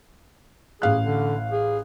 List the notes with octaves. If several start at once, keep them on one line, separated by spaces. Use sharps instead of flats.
A1 G#4 F5 F#6
D3
G#4